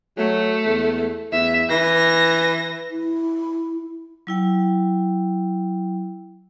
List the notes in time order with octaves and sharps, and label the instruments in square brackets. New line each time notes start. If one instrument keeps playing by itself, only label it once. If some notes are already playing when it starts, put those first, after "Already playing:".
[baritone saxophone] F#3 [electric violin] A3
[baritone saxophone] E2
[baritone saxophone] E2 [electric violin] E5
[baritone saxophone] E3 [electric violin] A#6
[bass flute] E4
[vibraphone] F#3 E4 G5